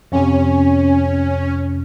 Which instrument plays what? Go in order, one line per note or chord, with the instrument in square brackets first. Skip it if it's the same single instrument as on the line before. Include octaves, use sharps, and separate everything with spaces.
[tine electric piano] F2 C3 [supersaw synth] C#4